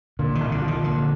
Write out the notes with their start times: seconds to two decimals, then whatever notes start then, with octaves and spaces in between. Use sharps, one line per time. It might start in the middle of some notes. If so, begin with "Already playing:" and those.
0.19 A#2 D3
0.35 D#3
0.41 C2
0.52 D3
0.62 F3
0.68 D#3
0.83 A#2 D3